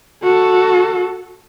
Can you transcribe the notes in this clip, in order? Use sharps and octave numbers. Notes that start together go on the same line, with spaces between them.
F#4 A4